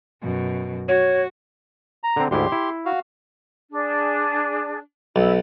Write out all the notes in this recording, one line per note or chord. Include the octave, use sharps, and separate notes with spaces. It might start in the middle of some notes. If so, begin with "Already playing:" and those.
F#2 B2
F#4 C#5
A#5
D3 C4
D2 G#2 E4 G4 C6
E4
F#4 F5
D4 G#4
B1 E4